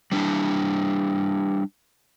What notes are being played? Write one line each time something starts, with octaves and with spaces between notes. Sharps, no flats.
G3 D4 E4